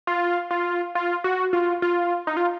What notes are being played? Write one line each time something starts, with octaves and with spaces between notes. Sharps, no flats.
F4
F4
F4
F#4
F4
F4
D#4
F4